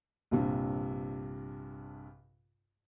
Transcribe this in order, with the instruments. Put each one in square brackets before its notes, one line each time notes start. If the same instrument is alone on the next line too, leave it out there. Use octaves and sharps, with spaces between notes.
[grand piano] A#1 G2 C3